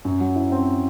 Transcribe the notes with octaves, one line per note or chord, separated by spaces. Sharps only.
F#2
F#3
E4
C4